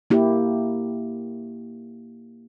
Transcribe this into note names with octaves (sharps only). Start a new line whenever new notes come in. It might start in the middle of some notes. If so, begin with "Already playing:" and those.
A#3 E4 G4